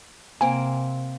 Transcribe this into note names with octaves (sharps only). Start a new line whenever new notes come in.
C3 A#3 C4 G#5